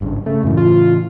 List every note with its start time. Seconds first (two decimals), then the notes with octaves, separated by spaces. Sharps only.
0.01 G#1 G2 C#3
0.26 C#3 A3
0.43 F#2 A2 C#3 E3
0.57 F4